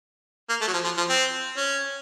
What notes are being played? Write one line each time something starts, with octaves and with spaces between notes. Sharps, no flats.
A#3
A3
F#3
F3
F3
F3
C4
C#4